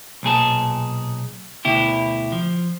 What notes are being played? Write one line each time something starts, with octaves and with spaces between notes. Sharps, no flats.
B1 A#2 G#4 A5
D2 B2 E4 G4
F3